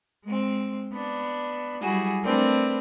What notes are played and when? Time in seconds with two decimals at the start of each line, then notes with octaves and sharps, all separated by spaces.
0.24 G#3 C4
0.93 B3 D4
1.81 F#3 G3 E4 F#4 G#4
2.23 A3 C4 D4 A#4 B4 D5